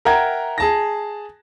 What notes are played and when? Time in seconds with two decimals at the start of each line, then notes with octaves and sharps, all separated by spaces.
0.05 A#4 E5 F#5 G5 A#5 G#6
0.58 G#4 A5 A#6